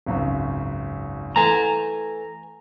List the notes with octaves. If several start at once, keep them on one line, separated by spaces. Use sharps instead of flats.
G#1 C#2 F#2
E3 A3 G#5 A#5